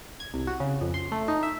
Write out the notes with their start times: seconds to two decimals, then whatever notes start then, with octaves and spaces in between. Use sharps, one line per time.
0.20 G#6
0.34 C2
0.47 F#4
0.60 C#3
0.81 F2
0.94 C6
1.12 A3
1.28 D#4
1.43 E5